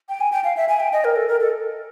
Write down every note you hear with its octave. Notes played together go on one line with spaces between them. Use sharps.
G5
G#5
G5
F5
E5
G#5
G5
D#5
A#4
A4
A#4
A4